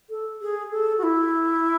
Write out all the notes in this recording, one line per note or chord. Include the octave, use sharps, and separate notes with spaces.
A4
G#4
A4
F#4
E4